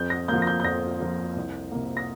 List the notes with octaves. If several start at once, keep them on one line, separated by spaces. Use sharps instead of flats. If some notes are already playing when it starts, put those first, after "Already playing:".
Already playing: F2 G6
A#6
F3 A#3 G6
A#6
G6
G6
F2 A#6
F3 A#3
C2
C3 A#3
A#6